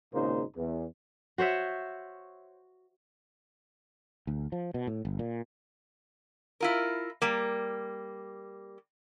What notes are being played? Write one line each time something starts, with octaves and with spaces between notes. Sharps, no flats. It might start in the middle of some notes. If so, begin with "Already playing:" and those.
G#1 A#2 C#3 A#3 D#4 C5
E2
F#4 C5 C#5 E5
D2
F3
B2
A2
G1
A#2
E4 F4 A#4
G3 A#3